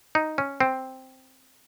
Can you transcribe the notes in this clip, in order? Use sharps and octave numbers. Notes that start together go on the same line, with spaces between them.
D#4
C#4
C4